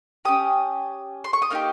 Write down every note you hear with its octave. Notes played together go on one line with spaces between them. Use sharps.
C#4 G4 D#6
C6
C#6
D#6
A#3 D#4 G4 F6